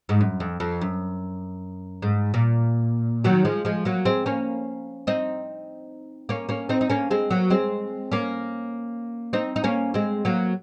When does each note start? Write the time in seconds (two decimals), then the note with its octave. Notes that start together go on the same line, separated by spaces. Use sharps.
0.09 G#2
0.21 F#2
0.40 F2
0.60 F2
0.81 F#2
2.02 G#2
2.34 A#2
3.24 D#3 F#3
3.45 F3 G#3
3.65 F3 G#3
3.85 F#3 A#3
4.05 G#3 C4
4.26 A#3 C#4
5.07 C4 D#4
6.29 A#3 C#4
6.49 A#3 C#4
6.69 C4 D#4
6.81 D#4
6.90 A#3 C#4
7.11 G#3 C4
7.30 F#3 A#3
7.50 G#3 C4
8.12 A#3 C#4
9.33 C4 D#4
9.56 D#4
9.64 A#3 C#4
9.94 G#3 C4
10.25 F#3 A#3